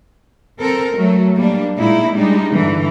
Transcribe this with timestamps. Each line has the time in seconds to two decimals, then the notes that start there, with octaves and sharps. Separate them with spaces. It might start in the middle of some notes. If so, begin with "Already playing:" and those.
0.60 C4 A4 A#4
0.96 F#3 A3
1.36 G3 A#3 D4
1.76 A#2 G#3 D#4 E4
2.14 G3 G#3 D4 D#4
2.54 G2 D3 E3